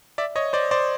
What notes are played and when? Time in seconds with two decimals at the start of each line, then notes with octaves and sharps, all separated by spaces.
0.18 D5 E5
0.36 C#5 D#5
0.53 C5 D5
0.71 C5 D5